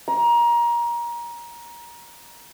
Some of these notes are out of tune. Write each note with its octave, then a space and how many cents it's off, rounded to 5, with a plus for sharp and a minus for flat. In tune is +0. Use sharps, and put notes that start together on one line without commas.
A#5 +25